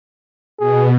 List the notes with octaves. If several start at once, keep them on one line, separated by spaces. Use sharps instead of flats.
B2 G#4